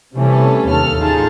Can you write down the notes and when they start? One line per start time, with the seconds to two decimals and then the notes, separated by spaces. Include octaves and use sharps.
0.15 C3 E3 G3 A3 C#4 A4
0.68 D#2 A#3 A4 F6
0.96 A1 D#4 F4 G#4 A5